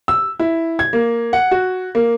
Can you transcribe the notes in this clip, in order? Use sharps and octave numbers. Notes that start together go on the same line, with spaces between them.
E6
E4
G#6
A#3
F#5
F#4
A#3